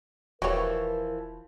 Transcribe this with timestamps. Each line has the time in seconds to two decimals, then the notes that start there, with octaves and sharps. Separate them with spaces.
0.42 D#1 E3 F3 F#4 G4 A#4 C#5